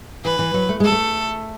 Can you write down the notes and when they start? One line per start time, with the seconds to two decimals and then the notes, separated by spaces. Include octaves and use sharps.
0.24 E3 B4
0.39 E3
0.54 F#3
0.69 A3
0.80 G#3 A4
0.92 A3